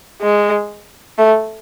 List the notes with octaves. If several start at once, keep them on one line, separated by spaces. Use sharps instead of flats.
G#3
A3